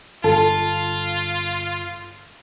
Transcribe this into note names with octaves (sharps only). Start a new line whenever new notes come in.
G1 F4 A4